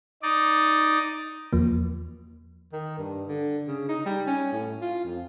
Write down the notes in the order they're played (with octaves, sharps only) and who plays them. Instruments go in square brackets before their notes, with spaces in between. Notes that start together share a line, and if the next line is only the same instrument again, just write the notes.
[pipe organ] D#4 D5
[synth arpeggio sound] E2 F3 A#3
[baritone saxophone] D#3
G2
D3
C#3
D#4
G3
C#4
A2
F4
F2